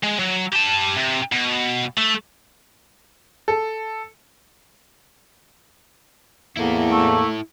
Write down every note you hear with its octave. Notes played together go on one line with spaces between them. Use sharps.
G#3
F#3
G4 A5
C3
B2
A3
A4
E2 A#3 E4 A4
A3